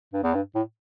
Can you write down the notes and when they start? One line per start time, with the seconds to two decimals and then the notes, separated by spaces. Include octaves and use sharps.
0.13 G2
0.23 E2
0.35 G2
0.55 A2